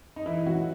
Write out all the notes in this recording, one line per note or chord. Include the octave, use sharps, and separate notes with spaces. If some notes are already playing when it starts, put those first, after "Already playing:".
D#4
E3 E4
F#3 F#4